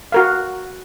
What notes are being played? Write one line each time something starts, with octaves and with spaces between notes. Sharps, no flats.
F#4 A#4 F5